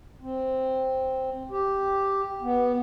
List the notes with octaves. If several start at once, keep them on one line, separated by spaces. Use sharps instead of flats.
C4
G4
B3